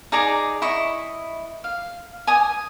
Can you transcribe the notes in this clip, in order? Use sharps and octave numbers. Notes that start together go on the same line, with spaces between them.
D#4 G#4 D5 A#5
E4 D#5 C#6
F5
G#5 D#6